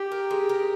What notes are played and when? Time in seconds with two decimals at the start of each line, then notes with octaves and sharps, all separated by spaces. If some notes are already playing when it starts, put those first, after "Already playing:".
Already playing: G4
0.12 A#4
0.31 G#3
0.49 A#4